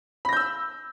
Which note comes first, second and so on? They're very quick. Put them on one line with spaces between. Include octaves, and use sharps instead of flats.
B5 A#6 G6 E6